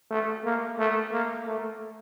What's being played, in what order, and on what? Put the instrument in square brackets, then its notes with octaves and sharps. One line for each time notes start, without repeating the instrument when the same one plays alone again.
[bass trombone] A3
A#3
A3
A#3
A3